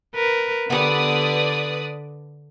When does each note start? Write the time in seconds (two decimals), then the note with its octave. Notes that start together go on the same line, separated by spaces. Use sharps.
0.15 A#4 B4
0.70 D3 B3 G4 B4 D5 D#6